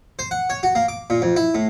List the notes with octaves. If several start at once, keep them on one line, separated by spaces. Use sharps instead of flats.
C5
F#5
C#5
F#4
A#3
D6
A#2
F2
E4
A2